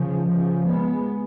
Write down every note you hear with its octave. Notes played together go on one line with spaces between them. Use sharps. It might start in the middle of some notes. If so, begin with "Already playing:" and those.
Already playing: C#3 F3
C#3 F3
G#3 B3